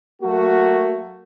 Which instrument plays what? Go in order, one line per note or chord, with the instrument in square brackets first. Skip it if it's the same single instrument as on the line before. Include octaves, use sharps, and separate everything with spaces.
[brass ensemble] F#3 A3 A#3 F#4